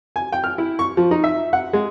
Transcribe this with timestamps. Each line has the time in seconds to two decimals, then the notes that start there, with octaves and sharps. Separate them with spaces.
0.16 G#5
0.32 G5
0.44 F6
0.58 E4
0.79 C#6
0.97 F3
1.11 D#4
1.24 E5
1.53 F#5
1.73 G#3